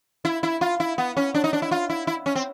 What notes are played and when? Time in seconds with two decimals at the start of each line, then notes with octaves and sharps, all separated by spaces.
0.25 E4
0.43 E4
0.61 F4
0.80 E4
0.98 B3
1.17 C#4
1.34 D4
1.44 D#4
1.53 D4
1.62 E4
1.71 F4
1.90 E4
2.07 E4
2.26 C#4
2.35 C4